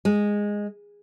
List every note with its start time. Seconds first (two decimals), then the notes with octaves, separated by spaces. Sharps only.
0.05 G#3